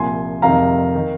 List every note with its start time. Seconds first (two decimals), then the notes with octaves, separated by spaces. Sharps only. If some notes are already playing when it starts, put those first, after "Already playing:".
Already playing: C2 A#2 F3 G#5 C6
0.42 F1 F2 C3 D#3 F5 A#5
0.95 D#3